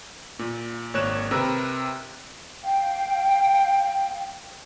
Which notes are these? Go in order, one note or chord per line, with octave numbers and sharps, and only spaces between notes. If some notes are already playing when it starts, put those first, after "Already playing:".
A#2
G#1 A#3 C#5 F#6 E7
C3 A#4 B4 E6
F5 G5